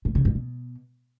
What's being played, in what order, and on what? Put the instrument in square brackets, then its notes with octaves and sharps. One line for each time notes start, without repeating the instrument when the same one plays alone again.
[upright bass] A2
C#3
G2
B2